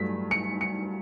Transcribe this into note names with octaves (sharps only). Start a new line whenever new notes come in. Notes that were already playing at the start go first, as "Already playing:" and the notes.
Already playing: G2 F#3 A3 B6
C#7
C#7